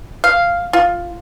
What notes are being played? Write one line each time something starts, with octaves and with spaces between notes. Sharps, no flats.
F5
F4